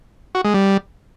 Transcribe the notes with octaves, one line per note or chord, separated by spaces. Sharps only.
F#4
G#3
G3